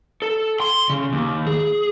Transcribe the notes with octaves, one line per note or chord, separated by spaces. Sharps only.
A4
C6
C#3
D#2
G#4